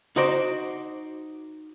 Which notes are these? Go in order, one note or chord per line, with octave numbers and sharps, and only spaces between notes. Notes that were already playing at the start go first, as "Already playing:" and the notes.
D#4 F#4 C5 D5